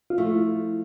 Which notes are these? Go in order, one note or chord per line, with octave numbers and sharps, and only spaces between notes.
F4
F3 A3 E4